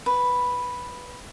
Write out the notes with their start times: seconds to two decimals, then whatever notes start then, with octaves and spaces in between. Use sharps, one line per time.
0.06 B4